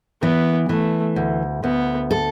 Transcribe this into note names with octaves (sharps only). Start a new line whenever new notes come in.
E3 B3
E3 A3
D2
D2 B3
A4